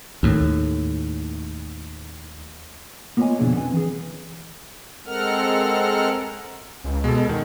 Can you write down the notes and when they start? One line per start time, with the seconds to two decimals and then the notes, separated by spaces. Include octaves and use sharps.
0.23 D#2 A2
3.17 A#3 B3 F4 C#5 D#5 G#5
3.39 F2 B2 D3 D4 E4 G#4
3.55 B3 C4 G#5
3.73 E3 G#4
5.06 G#3 C4 A4 A#4 F#5 F6
6.84 C#2
7.04 B2 G#3 A4
7.29 E2 D#3